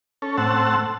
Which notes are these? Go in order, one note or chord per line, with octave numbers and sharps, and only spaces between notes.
C#4 A4
A2 C4 F#5 A5 E6